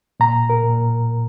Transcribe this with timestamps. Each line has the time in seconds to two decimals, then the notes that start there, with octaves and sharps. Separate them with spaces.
0.20 A#2 A#5
0.50 A#4
0.64 A#2